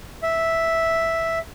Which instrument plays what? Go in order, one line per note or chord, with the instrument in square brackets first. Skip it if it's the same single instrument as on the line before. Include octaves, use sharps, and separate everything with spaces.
[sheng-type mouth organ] E5